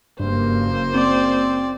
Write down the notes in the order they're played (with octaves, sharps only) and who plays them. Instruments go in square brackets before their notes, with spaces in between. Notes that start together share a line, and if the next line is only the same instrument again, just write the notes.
[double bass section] F#1 A#3 [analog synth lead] G2 [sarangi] C5
[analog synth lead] C4 [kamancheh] D5